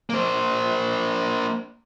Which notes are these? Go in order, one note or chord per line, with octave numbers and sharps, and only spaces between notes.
A#3 C5